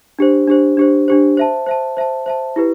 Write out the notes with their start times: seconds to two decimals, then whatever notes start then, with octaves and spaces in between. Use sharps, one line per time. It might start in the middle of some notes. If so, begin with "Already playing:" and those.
0.19 D4 G4 C5
0.48 D4 G4 C5
0.77 D4 G4 C5
1.08 D4 G4 C5
1.37 C5 E5 A5
1.66 C5 E5 A5
1.97 C5 E5 A5
2.26 C5 E5 A5
2.56 E4 G4 B4